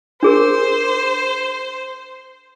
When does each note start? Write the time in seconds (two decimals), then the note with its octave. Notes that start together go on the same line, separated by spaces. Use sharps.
0.23 D4 G#4 A#4 C5